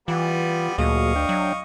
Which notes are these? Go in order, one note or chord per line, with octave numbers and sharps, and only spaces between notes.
E3 G3 B3 F4
D2 A#2 F#3 G#4 D#5 F5 C#6
D4 G5
F#3